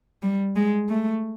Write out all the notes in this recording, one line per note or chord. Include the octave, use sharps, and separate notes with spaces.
G3
G#3
A3